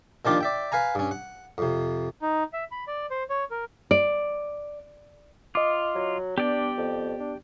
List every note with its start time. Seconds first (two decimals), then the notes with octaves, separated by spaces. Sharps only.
0.25 A#2 D#3 F3 D4 F4 G4
0.41 D5 E5 G5
0.72 B4 F5 G#5 A#5
0.95 G2 C#4
1.11 F#5
1.58 F2 C3
2.22 D#4
2.53 E5
2.71 B5
2.87 D5
3.10 C5
3.30 C#5
3.51 A#4
3.91 D5
5.55 F4 D#5 D6
5.95 F#3
6.38 B3 D4 G4 D5 G5
6.78 F2
7.20 D4